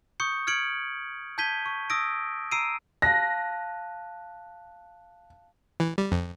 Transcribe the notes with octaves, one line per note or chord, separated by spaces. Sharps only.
C#6 D#6 G6 C#7
F6 G#6 C#7 D7 F#7
A5 G6 G#6 B6 D#7 G7
C#6
D#6 E6 A#6 D7
A#5 E6 C7 D7 D#7
F5 A5 F#6 A#6
E3
G3
F2